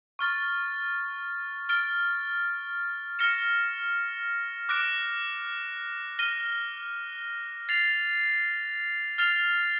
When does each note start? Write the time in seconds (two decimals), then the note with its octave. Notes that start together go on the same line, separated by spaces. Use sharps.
0.19 C#6 F6 A6
1.69 F6 A6 D7
3.19 F6 A#6 C#7 E7
4.69 D6 F#6 A#6 D7
6.19 F6 A#6 D#7 G7
7.69 A6 C7 F7
9.18 F6 A6 C7 F7